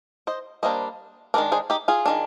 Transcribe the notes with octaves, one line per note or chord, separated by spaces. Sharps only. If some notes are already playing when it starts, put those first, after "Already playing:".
C5 D#5
G3 A#3 D4 C5 D#5
D#3 G#3 D4 A#4 D5
G#4 C5
D#4 G4
F4 G#4
D#3 G#3 D4